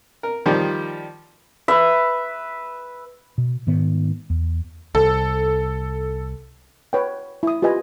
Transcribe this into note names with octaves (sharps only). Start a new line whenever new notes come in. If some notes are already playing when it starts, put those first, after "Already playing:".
A#4
D#3 F3 G3
B4 E5
B2
G#2 D#3 B3
E2
C2 A4
B4 C#5 F#5 G5
E4 D#6
F4 G4 B4 D#5 G#5